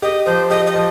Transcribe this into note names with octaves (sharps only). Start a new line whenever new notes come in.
G4 D#5
F3 C5
G4 D#5
D#5
F3